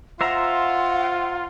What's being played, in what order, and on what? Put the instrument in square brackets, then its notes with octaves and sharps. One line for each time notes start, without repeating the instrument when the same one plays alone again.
[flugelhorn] F4 [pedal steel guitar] C5 E5 A#5 [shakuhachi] F#5